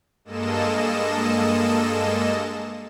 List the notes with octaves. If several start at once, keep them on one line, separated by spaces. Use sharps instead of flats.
G2 G#3 A#3 A4 D#5 E7